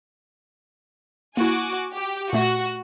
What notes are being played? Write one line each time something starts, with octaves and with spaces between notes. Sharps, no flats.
A#3 E4 F#4 G#5 D6
G4
A#2 A3 F#4